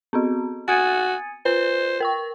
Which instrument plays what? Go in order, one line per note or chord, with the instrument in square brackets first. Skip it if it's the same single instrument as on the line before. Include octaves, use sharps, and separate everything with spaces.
[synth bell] B3 C4 F#4
[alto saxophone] F#4 [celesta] G#5 D#6 G#6 [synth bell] A6 C#7 D#7
[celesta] F4 [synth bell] B4 [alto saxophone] C5
[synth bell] A#4 G5 C#6